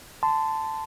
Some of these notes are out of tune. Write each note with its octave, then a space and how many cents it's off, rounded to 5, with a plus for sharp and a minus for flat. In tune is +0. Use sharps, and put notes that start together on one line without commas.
A5 +0 C6 -25